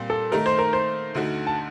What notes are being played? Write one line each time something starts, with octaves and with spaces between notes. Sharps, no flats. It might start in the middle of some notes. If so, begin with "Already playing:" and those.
Already playing: A#2 G3 C4 G4
A4
D#3 A3 D#4 A#4
C5
A#4
C5
D2 D3 A3 D#4 F#4
A5